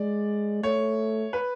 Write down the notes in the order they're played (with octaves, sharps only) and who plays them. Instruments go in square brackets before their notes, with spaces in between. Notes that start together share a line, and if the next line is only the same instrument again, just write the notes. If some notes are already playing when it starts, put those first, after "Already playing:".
Already playing: [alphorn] G#3 [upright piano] D5
[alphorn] A3 [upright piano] C#5
[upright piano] B4